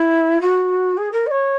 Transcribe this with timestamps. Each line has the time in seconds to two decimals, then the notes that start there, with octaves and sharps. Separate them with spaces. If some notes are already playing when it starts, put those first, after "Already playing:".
Already playing: E4
0.41 F#4
0.97 G#4
1.12 A#4
1.26 D#5
1.30 C#5